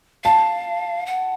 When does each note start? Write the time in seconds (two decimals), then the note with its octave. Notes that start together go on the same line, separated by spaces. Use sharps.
0.24 F5 A5
1.06 F#5